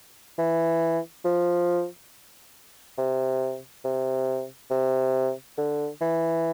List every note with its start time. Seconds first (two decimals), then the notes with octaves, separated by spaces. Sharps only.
0.38 E3
1.25 F3
2.98 C3
3.85 C3
4.70 C3
5.57 D3
6.01 E3